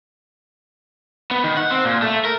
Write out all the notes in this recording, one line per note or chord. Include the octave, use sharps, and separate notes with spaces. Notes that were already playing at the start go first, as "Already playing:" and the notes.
B3
D#3
F#5
C4
A#2
A3
A#4